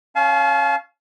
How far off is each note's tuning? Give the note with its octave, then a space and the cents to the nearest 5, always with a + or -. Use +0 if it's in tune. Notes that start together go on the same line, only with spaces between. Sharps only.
C#4 -5 F5 -5 A5 -45